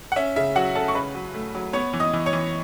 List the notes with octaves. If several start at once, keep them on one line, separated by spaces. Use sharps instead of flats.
F#5
C#4 E5
C#3 E5
F#3 F#4 F#5
C#4 A4 A5
C#6
C#3 B4 B5
F#3
A3
F#3
B3 C#5 C#6
E3
D#5 D#6
E3
C#5 C#6
E3